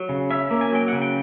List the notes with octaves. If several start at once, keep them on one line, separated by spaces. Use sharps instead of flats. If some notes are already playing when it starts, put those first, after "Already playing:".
Already playing: F#3
C#3
C#4 E5
A#3
G#5
F#3 G5
C#3 F#5
G5